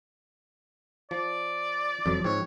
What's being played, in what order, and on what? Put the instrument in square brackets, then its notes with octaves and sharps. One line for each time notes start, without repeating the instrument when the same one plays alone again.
[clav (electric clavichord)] F3 [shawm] D5
[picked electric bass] E1 F3 F#3 [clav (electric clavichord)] F2
[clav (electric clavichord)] G#2 C4 [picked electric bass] F3 [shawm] C#5